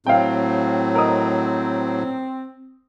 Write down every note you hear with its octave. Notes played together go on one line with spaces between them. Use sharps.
A2 F#3 C4 F5 G5
A#4 D#5 D#6